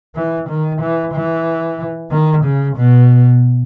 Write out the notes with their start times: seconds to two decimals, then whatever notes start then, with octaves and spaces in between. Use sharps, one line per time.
0.16 E3
0.49 D#3
0.81 E3
1.14 E3
2.11 D#3
2.44 C#3
2.76 B2